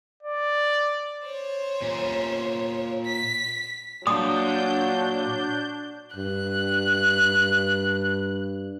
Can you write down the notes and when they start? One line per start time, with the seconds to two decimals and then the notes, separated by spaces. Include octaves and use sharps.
0.23 D5
1.26 C5 C#5
1.82 A#2 C#4
3.05 B6
4.07 A#2 F#3 D4 D#6 G6
6.16 G2 F#6